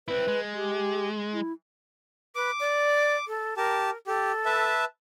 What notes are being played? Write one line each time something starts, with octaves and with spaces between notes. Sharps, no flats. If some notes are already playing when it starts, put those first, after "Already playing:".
C4 E4 B4
G#3
G4
E4
B4 D6
D5
A4
G4 A#4 A5
G4 A4
B4 E5 A5